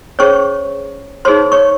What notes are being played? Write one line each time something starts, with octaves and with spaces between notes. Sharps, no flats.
C#4 G#4 C5 C#5 C#6
D#4 G#4 C5 C#5 C6
C#5 C#6